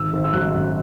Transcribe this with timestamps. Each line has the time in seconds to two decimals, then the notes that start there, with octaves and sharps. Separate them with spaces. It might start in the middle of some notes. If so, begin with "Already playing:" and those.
Already playing: G#1 E6
0.13 G#1
0.24 E6
0.33 F#2 F#6
0.53 F#2